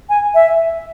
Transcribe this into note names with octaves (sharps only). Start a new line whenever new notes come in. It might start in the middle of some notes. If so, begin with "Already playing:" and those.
G#5
E5